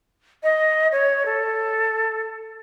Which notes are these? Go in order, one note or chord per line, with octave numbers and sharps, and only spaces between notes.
D#5
C#5
A4